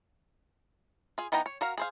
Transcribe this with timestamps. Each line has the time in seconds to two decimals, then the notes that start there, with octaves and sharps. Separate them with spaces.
1.18 F4 G#4
1.32 E3 B3 D#4 G5 A#5
1.46 C#5
1.61 F#4 A#4 F5
1.78 G#4 C5 F5